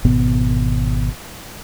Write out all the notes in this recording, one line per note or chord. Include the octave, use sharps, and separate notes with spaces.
G#1 B2 B3